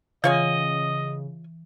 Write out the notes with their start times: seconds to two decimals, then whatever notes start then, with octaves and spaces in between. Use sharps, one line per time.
0.24 C#3 E3 F4 C#5 D#5 G#5